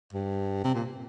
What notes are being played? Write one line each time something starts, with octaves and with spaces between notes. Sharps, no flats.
G2
C3
A#2